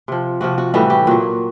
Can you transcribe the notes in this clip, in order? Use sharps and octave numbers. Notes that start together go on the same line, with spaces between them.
C3 F3
C3 F3 F#4
F#4
A2 E3 G3 F#4
G4
A#2 F#3 F#4